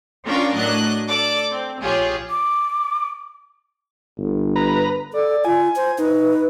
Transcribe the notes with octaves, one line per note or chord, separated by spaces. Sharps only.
C#4 D4 F4 A#4 F5 G5
A2 F#3 D4 D#5 F#6
A4 D5 D6
C4
A#1 F4 G4 G#4 C#5
D6
G1
B4 A#5
A4 D5
F4 G#5
C5
D#4 B4